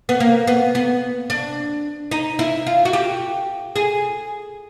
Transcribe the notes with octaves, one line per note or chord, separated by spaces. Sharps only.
B3
A#3
B3
B3
D4
D#4
E4
F4
F#4
G4
G#4